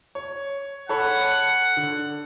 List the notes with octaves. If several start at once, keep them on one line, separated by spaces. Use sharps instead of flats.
C#5
A4 C#5 F#5 B5
D3